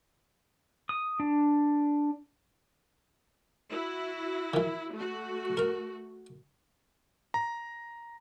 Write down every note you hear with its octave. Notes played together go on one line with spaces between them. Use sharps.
D#6
D4
E4 F#4
D#3 E3
A3 F#4
A#4 A#5
A#5